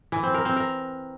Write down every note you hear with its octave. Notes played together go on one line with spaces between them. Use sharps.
E3
C4
A#4
C4
A#4